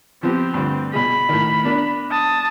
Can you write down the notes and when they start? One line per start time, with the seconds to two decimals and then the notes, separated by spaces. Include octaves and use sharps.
0.23 F3 B3 C4 G4
0.54 D2 G2
0.93 B2 G#4 B5
1.29 A2 D#3
1.64 B3 D4 A#4
2.11 A5 D#6